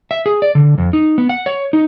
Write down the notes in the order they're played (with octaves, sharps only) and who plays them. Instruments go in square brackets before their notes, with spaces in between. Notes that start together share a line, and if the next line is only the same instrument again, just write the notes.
[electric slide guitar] E5
G#4
D5
D3
F2
D#4
B3
F#5
C#5
D#4